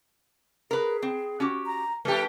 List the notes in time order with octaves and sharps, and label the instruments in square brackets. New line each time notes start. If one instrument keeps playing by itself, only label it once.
[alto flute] G#4 [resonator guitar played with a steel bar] A#4 B4
[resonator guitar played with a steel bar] C4
C#4 F#4 G4
[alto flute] A#5
[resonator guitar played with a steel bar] F3 D4 [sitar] A3 G4 [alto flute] B4